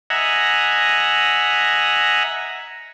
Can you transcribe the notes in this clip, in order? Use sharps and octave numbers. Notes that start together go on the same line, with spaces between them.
D#5 E5 F#5 G#5 A#5